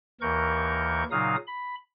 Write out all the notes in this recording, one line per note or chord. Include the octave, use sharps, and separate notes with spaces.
D#2 E3 A#4 C#6 G6
A#2 C#3 F#3 D#4 F5 D#6
B5